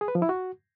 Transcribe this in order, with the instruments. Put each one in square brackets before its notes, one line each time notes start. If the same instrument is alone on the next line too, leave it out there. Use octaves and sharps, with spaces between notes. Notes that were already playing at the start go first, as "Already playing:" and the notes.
[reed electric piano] G#4
B4
F3
E4
F#4